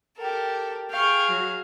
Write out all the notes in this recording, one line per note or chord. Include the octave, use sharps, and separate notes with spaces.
G4 A4 A#4
G#4 F5 G5 C#6
F#3